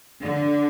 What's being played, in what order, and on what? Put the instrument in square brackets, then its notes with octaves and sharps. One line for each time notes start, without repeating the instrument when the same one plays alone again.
[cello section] D3